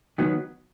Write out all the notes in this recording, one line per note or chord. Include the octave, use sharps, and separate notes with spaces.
D#3 F#3 B3